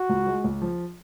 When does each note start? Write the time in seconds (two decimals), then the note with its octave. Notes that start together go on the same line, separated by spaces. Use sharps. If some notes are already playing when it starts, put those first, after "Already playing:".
Already playing: F#4
0.09 C#2
0.27 G#3
0.44 C#2
0.62 F3